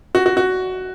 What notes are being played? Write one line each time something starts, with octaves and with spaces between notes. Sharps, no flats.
F#4
F#4
F#4